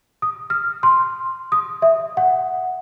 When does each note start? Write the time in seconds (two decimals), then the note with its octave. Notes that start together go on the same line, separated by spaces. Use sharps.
0.22 D#6
0.50 F6
0.83 C6
1.52 D#6
1.82 E5
2.17 F#5